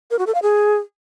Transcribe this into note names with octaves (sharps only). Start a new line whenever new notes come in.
A#4
F#4
A4
F5
G#4